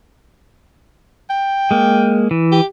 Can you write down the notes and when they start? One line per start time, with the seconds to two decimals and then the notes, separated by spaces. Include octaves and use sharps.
1.30 G5
1.71 G#3 A#3
2.31 E3
2.52 G4